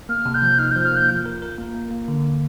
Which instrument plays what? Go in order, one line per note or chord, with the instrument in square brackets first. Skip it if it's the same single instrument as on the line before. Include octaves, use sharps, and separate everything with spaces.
[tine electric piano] A#3 [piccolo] F6
[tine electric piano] C3
[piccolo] G6
[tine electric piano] F3
[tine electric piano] D#4 [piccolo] F6
[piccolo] G6
[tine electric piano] F3
[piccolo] F6
[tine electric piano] A#3 [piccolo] G6
[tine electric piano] F4
A#4
A#4
A#3
A#3
A#3
D3